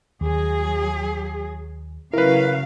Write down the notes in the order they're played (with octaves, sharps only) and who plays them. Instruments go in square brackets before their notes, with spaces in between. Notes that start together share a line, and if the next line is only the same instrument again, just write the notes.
[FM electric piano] D#2 [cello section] F#3 G#4
[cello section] C#3 F#3 F5 [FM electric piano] E4 [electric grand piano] A#4 B4